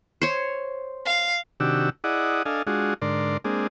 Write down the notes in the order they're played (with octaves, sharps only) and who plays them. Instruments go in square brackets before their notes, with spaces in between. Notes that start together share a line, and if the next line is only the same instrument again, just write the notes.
[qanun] C5 C#5
[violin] F5
[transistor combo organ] C3 D#3 D4 F#4 G4 E6
E4 G#4 D5 D#5 F#5
D4 A4 D#5 F5 G#5
G#3 D4 F4 F#4 G#4
G#2 D3 A#4 D5 C6
G#3 A#3 C4 D4 G#4